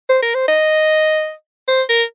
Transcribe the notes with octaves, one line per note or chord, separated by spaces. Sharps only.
C5
A#4
C5
D#5
C5
A#4